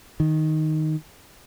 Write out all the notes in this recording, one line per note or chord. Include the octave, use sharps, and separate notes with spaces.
D#3